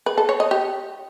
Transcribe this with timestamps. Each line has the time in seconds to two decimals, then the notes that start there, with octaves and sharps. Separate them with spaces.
0.06 B4
0.18 A4
0.29 C#5
0.40 D#5
0.51 G4